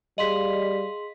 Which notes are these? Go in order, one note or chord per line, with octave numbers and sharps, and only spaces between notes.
G3 G#4 D#5 F5 C6 B6 F#7